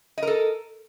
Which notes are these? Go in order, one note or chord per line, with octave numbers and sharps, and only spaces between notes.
A4 A#4 D#5